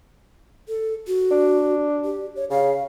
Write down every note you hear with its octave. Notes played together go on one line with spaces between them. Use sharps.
A4
F#4
D4
G4
C#5
C#3 F5